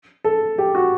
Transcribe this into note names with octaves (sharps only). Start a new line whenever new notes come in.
A4
G4
F#4